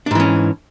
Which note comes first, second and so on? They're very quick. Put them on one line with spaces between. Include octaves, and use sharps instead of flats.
D4 G#2 E3 C#4